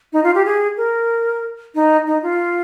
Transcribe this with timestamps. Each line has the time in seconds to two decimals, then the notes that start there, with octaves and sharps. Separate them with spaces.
0.13 D#4
0.23 F4
0.35 G4
0.45 G#4
0.77 A#4
1.75 D#4
2.07 D#4
2.23 F4